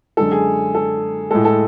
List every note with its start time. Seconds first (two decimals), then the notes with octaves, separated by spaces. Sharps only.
0.17 F#2 D3 G#3 A4
0.32 G#4
0.75 A4
1.31 A2 G#3 A4
1.45 A4